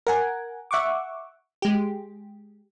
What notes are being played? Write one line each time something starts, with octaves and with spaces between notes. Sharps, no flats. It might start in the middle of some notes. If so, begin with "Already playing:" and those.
A#4 F#5 G#5
E5 F#5 C#6 D6
G#3 G4